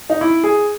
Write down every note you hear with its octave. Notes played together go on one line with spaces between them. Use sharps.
D#4
E4
G#4